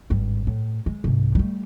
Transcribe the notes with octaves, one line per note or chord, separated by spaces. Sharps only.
G#1 G2
A2
G#3
C2 G#2
G3 A3